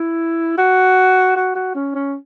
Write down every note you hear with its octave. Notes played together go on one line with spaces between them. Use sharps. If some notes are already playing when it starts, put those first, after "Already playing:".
Already playing: E4
F#4
F#4
F#4
C#4
C#4